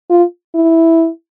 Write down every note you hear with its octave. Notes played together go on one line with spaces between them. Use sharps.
F4
E4